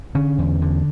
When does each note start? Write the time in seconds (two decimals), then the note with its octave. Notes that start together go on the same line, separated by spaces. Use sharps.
0.15 D3 C#4
0.38 E2
0.62 D3